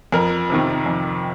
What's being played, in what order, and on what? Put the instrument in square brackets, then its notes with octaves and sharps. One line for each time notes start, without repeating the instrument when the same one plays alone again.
[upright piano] F2 A#4
C3 D#3
F2